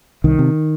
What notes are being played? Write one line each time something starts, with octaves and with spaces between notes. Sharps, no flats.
C2 D#3
C3